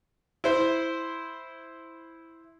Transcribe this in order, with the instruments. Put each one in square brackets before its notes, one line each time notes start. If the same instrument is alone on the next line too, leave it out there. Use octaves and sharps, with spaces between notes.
[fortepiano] E4 C5